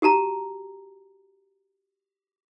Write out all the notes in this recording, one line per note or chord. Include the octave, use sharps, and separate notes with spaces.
F#4 G4 A5 A#5